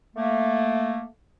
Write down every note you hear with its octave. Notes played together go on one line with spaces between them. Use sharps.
A3 A#3